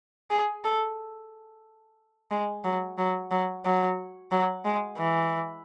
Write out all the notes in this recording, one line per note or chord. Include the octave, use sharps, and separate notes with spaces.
G#4
A4
G#3
F#3
F#3
F#3
F#3
F#3
G#3
E3